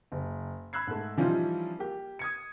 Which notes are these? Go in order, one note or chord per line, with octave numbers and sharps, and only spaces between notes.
F#1
B5 E6 F#6 G#6 C7
G#2 A3
E3 F3 G3 C#4 D#4 F4
A#3 G4
D#6 G#6 C#7